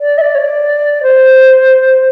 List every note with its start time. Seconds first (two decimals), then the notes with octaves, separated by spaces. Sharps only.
0.01 D5
0.18 E5
0.21 D5
0.35 C#5
0.38 D5
1.03 C5